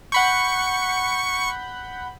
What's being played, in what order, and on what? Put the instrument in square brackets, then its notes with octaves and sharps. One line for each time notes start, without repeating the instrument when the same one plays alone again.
[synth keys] F#5 B5 G6 [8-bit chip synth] C#6 C#7